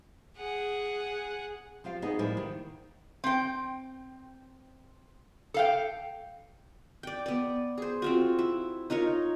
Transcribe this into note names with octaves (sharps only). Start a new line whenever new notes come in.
G#4 F#5
F3 F4 G4 F5
B3 D#4 F#4 G#4 B4 D#5
A2 F3 G3 A#3 E4 F5
D#3
C4 G5
A4 F5 G5
D5 G5
B3 D5
G#4 C5
C4 F4 F#4
E4
D#4 F4 A#4 C#5